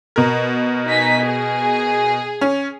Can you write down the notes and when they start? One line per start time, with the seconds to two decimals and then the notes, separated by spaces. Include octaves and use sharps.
0.16 B2 A#4
0.86 D#4 G#5 B6
1.25 G#4
2.41 C#4